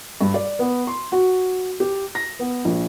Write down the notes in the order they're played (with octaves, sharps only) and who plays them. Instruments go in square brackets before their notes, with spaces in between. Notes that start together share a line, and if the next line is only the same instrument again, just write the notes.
[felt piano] G2
D5
B3
C6
F#4
G4
A#6
B3
A#1